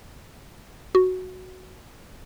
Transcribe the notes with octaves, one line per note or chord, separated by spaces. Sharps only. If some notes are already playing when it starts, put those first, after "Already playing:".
F#4